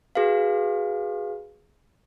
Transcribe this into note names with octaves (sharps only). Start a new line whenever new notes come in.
F#4 G#4 B4 F5